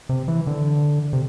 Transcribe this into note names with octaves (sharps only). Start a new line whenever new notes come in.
C3
E3
D3
C3